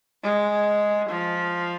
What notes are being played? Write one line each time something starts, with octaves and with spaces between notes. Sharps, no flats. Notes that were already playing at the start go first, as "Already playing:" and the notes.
G#3
F3